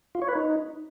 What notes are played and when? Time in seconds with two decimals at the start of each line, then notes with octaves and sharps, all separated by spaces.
0.15 F4
0.22 C#5
0.28 B4
0.35 D#4